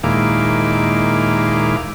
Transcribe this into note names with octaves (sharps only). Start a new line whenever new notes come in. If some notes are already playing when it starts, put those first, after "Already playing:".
D#2 A#2 G#3 E4 F5 D6